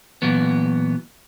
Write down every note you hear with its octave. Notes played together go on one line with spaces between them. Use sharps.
A#2 E3 F#3 B3